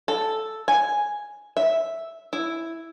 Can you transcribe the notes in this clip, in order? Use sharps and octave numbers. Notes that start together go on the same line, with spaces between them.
A4
G#5
E5
E4